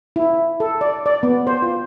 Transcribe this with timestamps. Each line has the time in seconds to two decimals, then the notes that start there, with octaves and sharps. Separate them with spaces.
0.16 E4
0.60 A4
0.81 D5
1.06 D5
1.23 B3
1.47 C5
1.62 F4